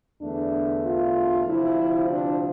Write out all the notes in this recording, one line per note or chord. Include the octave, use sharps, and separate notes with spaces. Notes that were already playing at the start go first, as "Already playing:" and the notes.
E2 D3 A3 D4
F4
D2 C3 F3 E4
D4